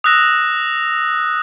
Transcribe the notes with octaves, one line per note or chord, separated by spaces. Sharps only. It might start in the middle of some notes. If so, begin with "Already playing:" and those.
D#6 E6 F#6 A#6 E7